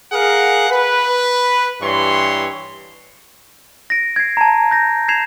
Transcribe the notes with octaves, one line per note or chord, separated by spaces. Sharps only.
G#4 A#4 F5 F#5
B4
G2 E3 C#5 C6
A#6 D7
G#6 C7
A5 A#5
G6 A#6
G#6 C7 E7 F7